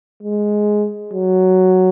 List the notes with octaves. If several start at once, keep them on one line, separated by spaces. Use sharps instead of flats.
G#3
F#3